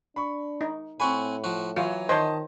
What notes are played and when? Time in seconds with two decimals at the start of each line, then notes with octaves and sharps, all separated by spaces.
0.16 D4 B5 C#6
0.61 D#4
1.00 A2 C4 F#4 G#5 B5 C#6
1.44 F3 F#4
1.77 E3 F#3 F4 C#5
2.09 D#3 C5 C#5 D#5 A5